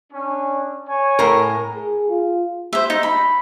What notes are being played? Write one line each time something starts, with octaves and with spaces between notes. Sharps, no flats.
C#4 D4
C#5 G#5
A2 A#4
G#4
F4
C5 E5
D#4
B5